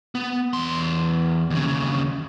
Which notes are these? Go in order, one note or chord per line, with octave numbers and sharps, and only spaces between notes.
B3
E2 C6
D#2 C#3